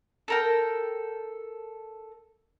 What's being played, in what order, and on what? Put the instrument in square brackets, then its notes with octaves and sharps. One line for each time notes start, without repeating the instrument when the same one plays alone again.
[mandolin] A4 A#4 G5